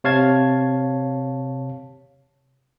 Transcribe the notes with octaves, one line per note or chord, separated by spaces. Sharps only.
C3 C#5 F5 A5 G#6